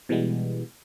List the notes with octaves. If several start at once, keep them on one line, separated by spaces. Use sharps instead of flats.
B2 E3 G3 G#3 B3